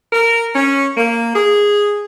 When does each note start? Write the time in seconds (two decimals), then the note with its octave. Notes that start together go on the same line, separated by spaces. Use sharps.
0.13 A#4
0.55 C#4
0.97 A#3
1.35 G#4